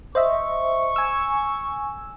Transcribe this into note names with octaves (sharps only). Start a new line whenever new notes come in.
C5 D#5 E5 C#6
G#5 E6